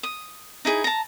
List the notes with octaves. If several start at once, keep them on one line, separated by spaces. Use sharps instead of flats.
D#6
D#4 E4 G#4
A5 A#5